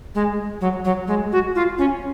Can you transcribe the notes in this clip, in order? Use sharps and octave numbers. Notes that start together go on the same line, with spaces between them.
G#3
F#3
F#3
G#3
F#4
F4
C#4